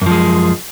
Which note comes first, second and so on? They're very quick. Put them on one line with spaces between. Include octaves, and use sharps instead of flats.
F#2 F3 G#3